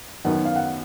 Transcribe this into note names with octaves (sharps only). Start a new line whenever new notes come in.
F#2 D#3 F#3 B3 D#4 F#5
F5
F#5